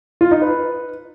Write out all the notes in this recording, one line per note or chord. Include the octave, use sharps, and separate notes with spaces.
F4
D#4
B4